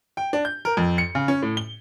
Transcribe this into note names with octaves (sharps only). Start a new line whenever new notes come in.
G5
D4
G6
A#4
F2
C#7
C#3
C#4
A2
G7